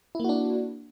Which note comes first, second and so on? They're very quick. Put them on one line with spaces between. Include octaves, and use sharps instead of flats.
E4 A#3 F#4 D4